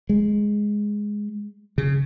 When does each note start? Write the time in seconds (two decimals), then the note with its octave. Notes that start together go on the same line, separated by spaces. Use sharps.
0.09 G#3
1.78 C#3